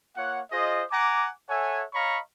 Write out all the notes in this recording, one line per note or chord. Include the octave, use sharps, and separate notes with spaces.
A#3 F4 C#5 F#5
F4 G#4 C5 D#5
F#5 G#5 A#5 D6
A4 C#5 E5 F#5 G#5
C#5 D#5 F5 A#5 B5 C#6